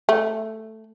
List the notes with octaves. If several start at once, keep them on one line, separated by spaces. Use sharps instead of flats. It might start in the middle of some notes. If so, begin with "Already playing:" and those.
A3